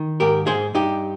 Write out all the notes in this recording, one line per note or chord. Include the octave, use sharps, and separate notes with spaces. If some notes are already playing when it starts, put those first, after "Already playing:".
Already playing: D#3
G#2 G4 A#4
G#2 G#4 C5
G2 D#4 G4